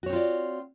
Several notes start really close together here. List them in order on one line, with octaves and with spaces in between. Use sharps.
F#4 C#5 C4 F4 D5